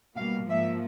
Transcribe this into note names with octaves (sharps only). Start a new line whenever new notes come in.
B2 G3 A#3 F5
G#2 F3 A#3 E5